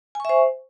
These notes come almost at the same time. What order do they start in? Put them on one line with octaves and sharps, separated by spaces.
G#5 C#6 E5 C5